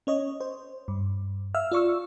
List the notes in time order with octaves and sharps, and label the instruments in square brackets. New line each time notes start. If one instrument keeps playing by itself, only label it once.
[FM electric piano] C#4 C#5 D#5
C5
G2
E5 F5 E6 F6
F4 D5 C#6 E6